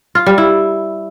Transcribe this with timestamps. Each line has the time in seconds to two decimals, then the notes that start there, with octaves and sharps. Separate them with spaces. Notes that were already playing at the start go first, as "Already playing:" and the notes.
0.15 F4
0.26 G3
0.38 E4